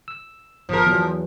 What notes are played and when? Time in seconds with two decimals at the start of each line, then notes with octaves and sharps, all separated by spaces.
0.08 E6
0.69 G1 F3 A#4
0.86 E2 E3 F#3